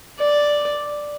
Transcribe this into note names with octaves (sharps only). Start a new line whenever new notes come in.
D5